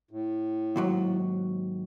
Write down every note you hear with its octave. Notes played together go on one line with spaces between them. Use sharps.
A2
D#2 G#2 F#3